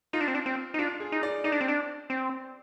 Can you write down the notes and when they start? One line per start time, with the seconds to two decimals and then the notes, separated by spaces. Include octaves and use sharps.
0.13 D#4 F4
0.21 D4
0.28 C4
0.35 D4
0.46 C4
0.74 D#4
0.79 D4 F4
1.00 G#4
1.12 D#4
1.23 D5
1.44 D#4 D5
1.52 D4
1.61 C4
1.68 D4
2.10 C4